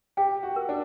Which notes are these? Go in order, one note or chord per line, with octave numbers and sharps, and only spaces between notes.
G4 G5
F#4
A#4
D4